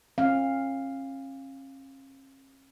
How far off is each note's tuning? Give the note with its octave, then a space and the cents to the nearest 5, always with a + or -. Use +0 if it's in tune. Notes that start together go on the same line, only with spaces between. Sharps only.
C#4 -40 F5 +0